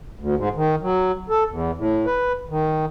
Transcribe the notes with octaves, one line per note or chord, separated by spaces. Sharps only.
D2
G#2
D#3
F#3
A4
E2
A2
B4
D#3